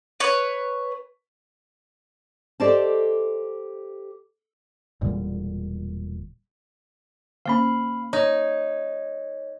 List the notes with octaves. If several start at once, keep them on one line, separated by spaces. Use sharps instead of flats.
B4 C#5
G4 A4 C5 D5 D#5 A5
E1 A#2 D3 G3
D3 A#3 C#4 F5 B5
D#4 C#5